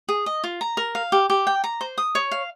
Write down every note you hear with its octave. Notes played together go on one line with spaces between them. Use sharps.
G#4
D#5
F4
A#5
A#4
F5
G4
G4
G5
A#5
C5
D#6
C#5
F5